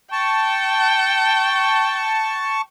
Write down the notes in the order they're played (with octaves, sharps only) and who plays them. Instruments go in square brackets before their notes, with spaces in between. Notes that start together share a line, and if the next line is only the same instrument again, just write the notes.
[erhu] G5 [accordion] A5 C#6